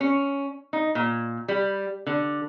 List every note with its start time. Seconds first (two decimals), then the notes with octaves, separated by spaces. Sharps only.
0.01 C#4
0.73 D#4
0.95 A#2
1.48 G3
2.06 D3